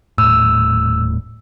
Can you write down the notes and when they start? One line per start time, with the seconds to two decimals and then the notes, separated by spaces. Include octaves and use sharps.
0.18 D#1 A2 E6